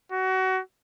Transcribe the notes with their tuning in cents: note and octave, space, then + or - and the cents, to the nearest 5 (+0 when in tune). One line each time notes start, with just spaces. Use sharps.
F#4 +25